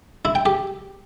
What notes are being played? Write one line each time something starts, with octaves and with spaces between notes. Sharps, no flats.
E4
G5
G4